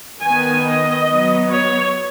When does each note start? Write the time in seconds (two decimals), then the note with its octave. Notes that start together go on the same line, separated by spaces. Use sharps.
0.21 D#3 B3 G#5
0.65 D#5
1.09 F#3 B3
1.52 C#5